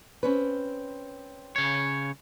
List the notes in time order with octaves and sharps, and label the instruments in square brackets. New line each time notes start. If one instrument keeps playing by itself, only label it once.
[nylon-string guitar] C4 C#4 B4
[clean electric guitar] C#3 C#5